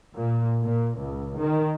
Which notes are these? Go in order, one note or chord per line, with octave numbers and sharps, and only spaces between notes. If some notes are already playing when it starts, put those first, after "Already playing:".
A#2
A#2
C#2
D#3